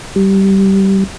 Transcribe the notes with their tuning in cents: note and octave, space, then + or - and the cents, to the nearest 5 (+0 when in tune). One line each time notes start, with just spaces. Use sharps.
G3 -15